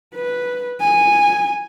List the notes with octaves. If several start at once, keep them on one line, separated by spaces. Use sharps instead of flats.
B4
G#5